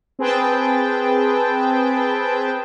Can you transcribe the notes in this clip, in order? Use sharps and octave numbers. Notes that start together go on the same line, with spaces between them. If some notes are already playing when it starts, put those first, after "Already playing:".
C4 G#4 B4 G5 A5